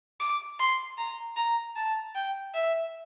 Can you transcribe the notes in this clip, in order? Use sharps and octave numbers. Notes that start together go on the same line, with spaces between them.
D6
C6
A#5
A#5
A5
G5
E5